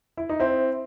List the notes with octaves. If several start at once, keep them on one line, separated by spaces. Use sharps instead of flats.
E4
D#4
C4 E4